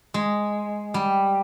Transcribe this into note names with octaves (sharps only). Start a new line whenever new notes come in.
G#3
G3